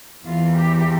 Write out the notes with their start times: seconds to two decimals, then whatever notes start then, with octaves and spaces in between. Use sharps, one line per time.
0.25 E2 E3 A#3 F4
0.56 G4